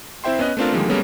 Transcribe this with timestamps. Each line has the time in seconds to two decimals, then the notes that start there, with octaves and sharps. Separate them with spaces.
0.24 C4 E4 C5 E5 G5 C6
0.39 B3 C#4 D#5 F#6
0.57 A3 B3 C4 D4 F4 A#4
0.73 D3 D#3 F3 G3 G#3 A#3
0.89 G3 G#3 A#3 B3 C#4 A4